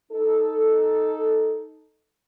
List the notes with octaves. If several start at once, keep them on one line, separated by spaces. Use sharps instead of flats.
D#4 A4